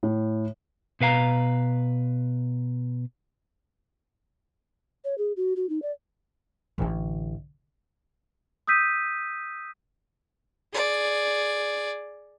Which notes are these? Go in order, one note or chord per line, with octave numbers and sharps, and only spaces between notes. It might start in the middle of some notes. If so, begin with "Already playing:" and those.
A2
B2 B4 F5 A#5
C#5
G#4
F#4
F#4
D#4
D5
A1 D3
D#6 E6 G6 B6 D#7
G#4 D5